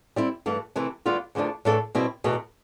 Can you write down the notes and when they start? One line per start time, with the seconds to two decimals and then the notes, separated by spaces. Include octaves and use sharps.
0.16 G3 C4 E4
0.46 G2 E3 A3
0.76 C3 E3 A3 C4 E4
1.06 D2 D3 G3 B3 F4
1.35 E2 D3 F3 A3 D4
1.65 A2 E3 A3 D4 A4
1.95 B2 G3 C4 E4
2.24 E2 B2 A3